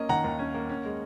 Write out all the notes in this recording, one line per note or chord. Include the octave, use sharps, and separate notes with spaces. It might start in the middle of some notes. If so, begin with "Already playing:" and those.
Already playing: A#3 C#4 D#5
D#3 F#5 A#5
D#2
C#4
A#3
C#4
G#3